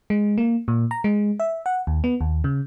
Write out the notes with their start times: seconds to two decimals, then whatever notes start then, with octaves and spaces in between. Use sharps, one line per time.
0.10 G#3
0.38 A#3
0.68 A#2
0.91 A#5
1.04 G#3
1.40 E5
1.66 F#5
1.87 D#2
2.04 B3
2.21 D#2
2.44 C#3